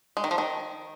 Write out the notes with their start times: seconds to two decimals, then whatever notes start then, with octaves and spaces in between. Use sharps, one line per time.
0.17 G#3
0.24 D#3
0.31 F3
0.38 D#3